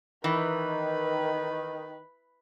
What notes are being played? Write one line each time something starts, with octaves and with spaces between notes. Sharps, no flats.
D#3 E3 B4